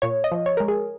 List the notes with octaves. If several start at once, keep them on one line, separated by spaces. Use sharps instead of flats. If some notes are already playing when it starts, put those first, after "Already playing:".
A#2 C#5
D#5
F3
C#5
G#3 A#4
G#4